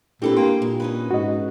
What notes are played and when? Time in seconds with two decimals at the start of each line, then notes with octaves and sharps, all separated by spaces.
0.22 A#2 C4 D4 E4 G4 A4 B4
0.37 A#3 G5 C6
0.62 A#2 G#3
0.80 C#4 D#4 B4
1.11 G#2 F#4 D#5